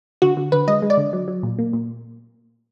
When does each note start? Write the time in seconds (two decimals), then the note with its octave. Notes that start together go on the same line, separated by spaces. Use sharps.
0.22 D3 F#4
0.37 D3
0.52 D3 B4
0.68 G#3 D#5
0.82 G#3
0.90 D5
0.97 D3
1.13 F#3
1.28 F#3
1.43 A#2
1.59 A#3
1.73 A#2